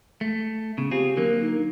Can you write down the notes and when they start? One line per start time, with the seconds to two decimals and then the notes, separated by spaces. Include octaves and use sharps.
0.21 A3
0.78 C#3 B3
0.91 C4 F4 G4 G#4
1.17 D3 F#3 A#3 A#4
1.41 D#4